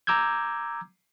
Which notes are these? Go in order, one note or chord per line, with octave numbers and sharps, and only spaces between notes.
A#5 D6 E6 G6 G#6